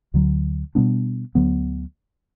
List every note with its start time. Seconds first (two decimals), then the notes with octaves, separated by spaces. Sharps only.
0.14 D2 D3 F#3
0.75 B2 G3 B3 D4
1.35 D2 D3 F#3 B3